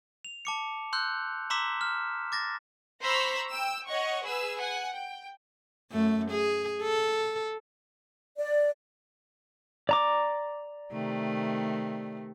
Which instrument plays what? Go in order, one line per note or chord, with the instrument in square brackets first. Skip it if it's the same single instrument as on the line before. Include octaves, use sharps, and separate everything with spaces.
[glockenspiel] F7
A5 D6 C#7
C6 E6 F#6 G6
A#5 C6 D6 E6 B6 E7
F6
D6 A6 A#6
[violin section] C5 A#5 B5 C#6 E6
G5 E6
C#5 D#5 F#5 C#6
G#4 B4 E6
F#5 G#5
G5
[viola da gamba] F#2 A3
G#4
A4
[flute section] D5
[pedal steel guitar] D5 A#5 D6
[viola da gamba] C3 D#3 A3